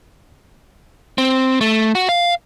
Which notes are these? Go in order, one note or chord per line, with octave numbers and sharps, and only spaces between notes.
C4
A3
F#4
F5